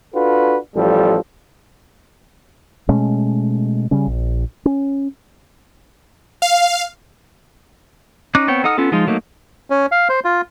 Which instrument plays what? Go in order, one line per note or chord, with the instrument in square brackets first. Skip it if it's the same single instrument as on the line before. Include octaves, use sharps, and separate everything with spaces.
[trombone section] D4 F4 F#4 A4 B4
A1 F3 G3 A4
[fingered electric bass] B2 G#3 A3 C#4
C#3 G3 C#4
A#1
C#4
[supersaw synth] F5
[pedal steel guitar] C#4 D#4 D6 F#6
B3 C4 C#5 G5
D#4 A4 F#5 D#6 F6
B3 C#4 F4 A4
F3 G#3 D#4 F4
F#3 A3 A#3 D#4
[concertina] C#4
F5
C5
F4